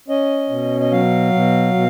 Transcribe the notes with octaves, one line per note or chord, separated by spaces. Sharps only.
C#4 D#5
B2
D#5
F#3 F5
B2
B2